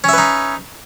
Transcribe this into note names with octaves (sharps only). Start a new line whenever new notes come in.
C#4 D#4 B4 E5